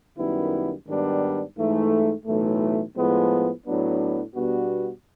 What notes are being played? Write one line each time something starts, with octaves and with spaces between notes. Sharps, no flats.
F#2 D#3 G3 B3 E4
G#2 D#3 G3 B3 D4
G#2 E3 A3
B1 A2 E3 A3
A2 F3 G#3 B3
A2 F#3 B3 D4
B2 G3 B3 D4 F#4